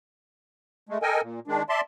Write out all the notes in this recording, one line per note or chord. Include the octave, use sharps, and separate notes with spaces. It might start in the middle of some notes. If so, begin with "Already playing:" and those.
G#3 A3
A4 A#4 D#5 G5 G#5
A#2
D#3 G#3 D4
D5 E5 A5 C6